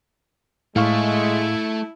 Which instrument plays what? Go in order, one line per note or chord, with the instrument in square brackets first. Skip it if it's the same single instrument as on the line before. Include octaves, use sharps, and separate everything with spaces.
[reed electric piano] A2 F5 C#6 [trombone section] G#3 [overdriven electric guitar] A3 [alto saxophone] E4